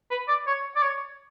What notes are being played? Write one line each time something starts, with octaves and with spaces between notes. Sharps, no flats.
B4
D5
C#5
D5
C#5